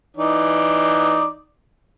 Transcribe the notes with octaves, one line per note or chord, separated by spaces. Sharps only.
E3 D#4 D5